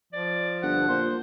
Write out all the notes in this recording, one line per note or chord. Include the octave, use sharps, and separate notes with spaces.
F3 D5
G1 F#5
A#2 C5